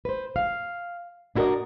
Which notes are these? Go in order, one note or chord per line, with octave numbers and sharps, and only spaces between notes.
B4 C5
F5
D4 E4 F#4 A#4 D5 D#5